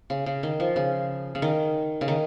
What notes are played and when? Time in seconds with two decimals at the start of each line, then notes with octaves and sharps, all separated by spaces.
0.10 C#3
0.26 C#3
0.43 D#3
0.60 F3
0.76 C#3
1.35 C#3
1.42 D#3
2.01 C#3
2.08 D#3